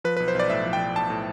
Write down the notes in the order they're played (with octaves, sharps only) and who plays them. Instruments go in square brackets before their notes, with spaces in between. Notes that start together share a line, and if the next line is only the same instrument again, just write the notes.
[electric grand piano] F3 B4
B4
B1
C5
B1 D5
A2 E5
F3
G5
B1
B1 A5
A2